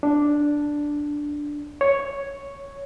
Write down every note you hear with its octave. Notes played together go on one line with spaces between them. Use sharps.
D4
C#5